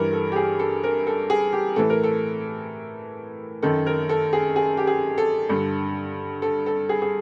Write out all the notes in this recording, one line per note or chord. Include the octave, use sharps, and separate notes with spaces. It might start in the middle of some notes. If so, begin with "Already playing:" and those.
Already playing: G2 E3 A#4
A4
G4
G#4
A4
A#4
A4
G#4
G4
A2 E3 A4
A#4
A4
F#2 D#3 A4
A#4
A4
G#4
G#4
G4
G#4
A4
G2 D3
A4
A4
G#4
G#4